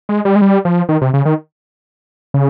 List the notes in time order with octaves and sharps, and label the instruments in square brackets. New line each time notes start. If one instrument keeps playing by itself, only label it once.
[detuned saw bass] G#3
G3
G#3
G3
F3
D#3
C3
C#3
D#3
C#3